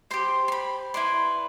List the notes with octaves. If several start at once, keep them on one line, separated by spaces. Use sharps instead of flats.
G4 C5 C6
C6
B5
E4 B4 D5 C6